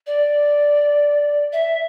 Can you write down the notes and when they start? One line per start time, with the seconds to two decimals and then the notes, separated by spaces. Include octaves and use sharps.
0.07 D5
1.53 E5